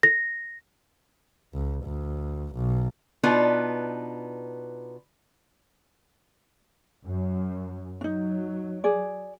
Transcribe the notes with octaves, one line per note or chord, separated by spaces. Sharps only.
A#6
C#2
D2
B1
B2 B3 D4 D#4 F4 B4
F#2
F#3 D4 D#4
G#4 D5